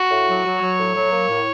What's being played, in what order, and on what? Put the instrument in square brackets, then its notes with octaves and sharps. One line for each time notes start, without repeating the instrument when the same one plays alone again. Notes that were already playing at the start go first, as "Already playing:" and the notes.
Already playing: [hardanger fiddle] F#4
[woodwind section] A2
F#3
F#3
[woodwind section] F#3 [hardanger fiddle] C#5
[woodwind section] A2
F#3
A#3
A2